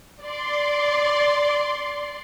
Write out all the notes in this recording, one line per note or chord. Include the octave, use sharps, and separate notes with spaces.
D5 C6